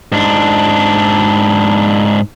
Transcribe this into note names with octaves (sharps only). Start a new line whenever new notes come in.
G#2 D4